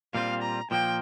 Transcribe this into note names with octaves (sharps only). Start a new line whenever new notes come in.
A#2 G3 C4 F4 F5
A#5
A#2 F3 A#3 G5